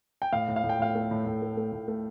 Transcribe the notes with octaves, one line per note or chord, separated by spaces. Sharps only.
G5
A2 F5
A2
F5
A2
G5
A2 F5
A3
A2
A2
A3
A3
A2
A3